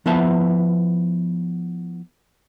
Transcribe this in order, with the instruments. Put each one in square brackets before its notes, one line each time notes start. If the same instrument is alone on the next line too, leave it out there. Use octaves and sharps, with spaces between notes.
[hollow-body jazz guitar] F3 B3 E4 B4 E5 A5